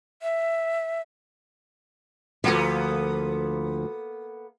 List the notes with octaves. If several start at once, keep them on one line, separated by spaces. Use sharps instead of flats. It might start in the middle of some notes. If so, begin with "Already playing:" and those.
E5
D2 F3 A#3 B3 A4